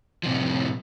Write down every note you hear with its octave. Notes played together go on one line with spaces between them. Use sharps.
A2 C3 F3